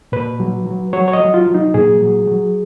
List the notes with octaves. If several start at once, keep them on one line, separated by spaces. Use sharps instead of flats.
A#2 B4
F#3
F#3
F#3 C#5
C#5
D#5
F#3
F4
F#3
D#4
A#2 G#4
F#3
F#3